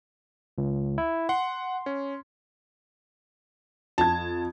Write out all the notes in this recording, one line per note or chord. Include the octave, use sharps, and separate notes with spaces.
C#2
E4
F#5 C6
C#4
F2 A5 G#6